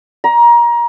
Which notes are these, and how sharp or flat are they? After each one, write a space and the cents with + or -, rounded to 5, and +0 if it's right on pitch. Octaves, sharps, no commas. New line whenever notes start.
A#5 +25